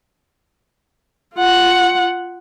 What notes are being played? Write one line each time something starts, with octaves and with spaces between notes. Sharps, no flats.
F4 F#5